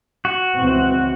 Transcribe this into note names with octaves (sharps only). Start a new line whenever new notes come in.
F#4
C#2 E3 C4